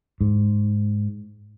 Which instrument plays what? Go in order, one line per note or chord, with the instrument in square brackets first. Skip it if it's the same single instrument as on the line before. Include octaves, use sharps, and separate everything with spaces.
[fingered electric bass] G#2